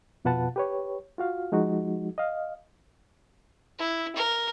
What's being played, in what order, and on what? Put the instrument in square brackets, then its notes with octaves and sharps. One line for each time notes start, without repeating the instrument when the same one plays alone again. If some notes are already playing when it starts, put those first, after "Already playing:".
[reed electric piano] F2 B2 F4 B4 F#5 A5
G4 B4 C#5
F4 F#4 F5
F3 G#3 D#4 F#4
D#5 F5
[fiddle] E4
A#4